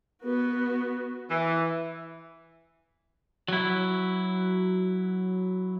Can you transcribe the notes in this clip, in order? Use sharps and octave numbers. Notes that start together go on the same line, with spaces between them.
B3 F#4
E3
F#3 E4